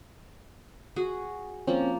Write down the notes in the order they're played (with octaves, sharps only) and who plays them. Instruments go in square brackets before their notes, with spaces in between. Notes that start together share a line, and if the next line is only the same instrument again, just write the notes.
[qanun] F#4 G#4
[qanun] F3 A#3 [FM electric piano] C4 C#4